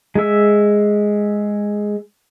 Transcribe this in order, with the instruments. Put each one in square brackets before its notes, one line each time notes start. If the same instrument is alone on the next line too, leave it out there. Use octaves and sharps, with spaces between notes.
[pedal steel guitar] G#3 E5